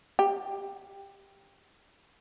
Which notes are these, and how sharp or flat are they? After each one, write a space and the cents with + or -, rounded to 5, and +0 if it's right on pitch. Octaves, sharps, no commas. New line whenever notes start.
G4 +10